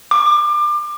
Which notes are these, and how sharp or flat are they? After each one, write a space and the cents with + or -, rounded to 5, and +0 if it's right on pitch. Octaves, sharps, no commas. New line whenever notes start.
D6 +30